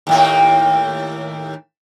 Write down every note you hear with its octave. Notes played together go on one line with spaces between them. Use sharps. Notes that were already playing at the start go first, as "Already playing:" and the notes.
D#2 A2 A#3